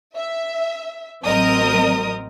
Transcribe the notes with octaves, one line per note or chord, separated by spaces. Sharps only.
E5
A1 F#3 C4 A#4 D#5 D#6